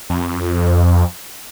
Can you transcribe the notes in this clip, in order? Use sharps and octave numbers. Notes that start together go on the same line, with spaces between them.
F2